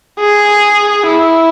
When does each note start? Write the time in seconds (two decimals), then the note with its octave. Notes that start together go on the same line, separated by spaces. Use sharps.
0.19 G#4
1.06 E4